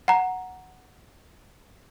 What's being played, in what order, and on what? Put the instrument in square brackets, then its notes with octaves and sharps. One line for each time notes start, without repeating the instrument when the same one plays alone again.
[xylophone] F#5 A#5